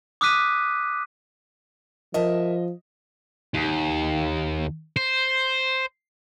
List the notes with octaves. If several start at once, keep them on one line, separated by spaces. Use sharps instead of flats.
D6 D#6 F6 F#6 B6 D#7
F3 A#4 D#5 E5 A5
D#2
C5